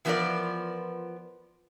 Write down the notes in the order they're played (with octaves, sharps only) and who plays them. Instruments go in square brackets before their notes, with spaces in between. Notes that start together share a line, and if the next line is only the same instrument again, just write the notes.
[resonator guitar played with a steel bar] E3 F3 B3 F4 A#4 D5